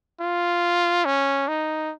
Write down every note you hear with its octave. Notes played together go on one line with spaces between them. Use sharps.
F4
C#4
D#4